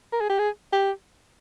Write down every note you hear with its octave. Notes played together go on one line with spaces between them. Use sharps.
A#4
G#4
G4
G#4
G4